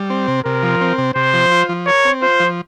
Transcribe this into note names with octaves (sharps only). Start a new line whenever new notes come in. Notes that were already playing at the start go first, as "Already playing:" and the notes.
Already playing: G3
C4
C3
C3 A#4
F3
C4
C3
C3 C5
F3
F4
F3
A#4 C#5
C4
F4 C5
F3